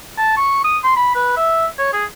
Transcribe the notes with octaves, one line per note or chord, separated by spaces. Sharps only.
A5
C#6
D#6
C6
B5
B4
E5
C#5
G#4